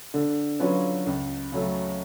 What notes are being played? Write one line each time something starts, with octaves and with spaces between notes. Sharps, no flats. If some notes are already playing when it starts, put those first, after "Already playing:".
D3
F#3 C#4 F4 B4
C#2
C#3 F#3 A3